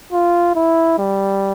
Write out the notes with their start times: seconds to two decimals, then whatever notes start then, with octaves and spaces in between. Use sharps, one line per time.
0.13 F4
0.56 E4
0.99 G3